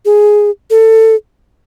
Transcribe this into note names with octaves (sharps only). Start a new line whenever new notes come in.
G#4
A4